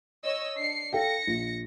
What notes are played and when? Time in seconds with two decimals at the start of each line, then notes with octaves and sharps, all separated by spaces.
0.23 C#5 D#5 E6
0.57 D4 C7 C#7
0.93 A4 F5 G5 A#6 C#7
1.27 A#1